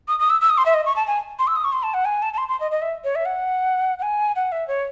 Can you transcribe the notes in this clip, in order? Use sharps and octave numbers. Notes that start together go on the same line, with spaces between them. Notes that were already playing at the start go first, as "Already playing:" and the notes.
D#6
D#6
E6
E6
D#6
C6
E5
D#5
C#6
A5
G#5
C6
E6
D#6
C#6
C6
A5
F#5
G#5
A5
A5
C6
C6
D#5
D#5
E5
C#5
E5
F#5
F#5
G#5
F#5
E5
C#5